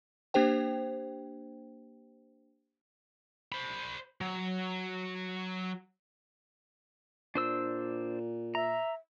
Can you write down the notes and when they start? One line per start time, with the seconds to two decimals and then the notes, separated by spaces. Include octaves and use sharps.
0.34 A#3 D4 G4 C5 G5
3.52 C5 B5
4.21 F#3
7.35 A#2 D4 C5 E6
8.55 E5 A#5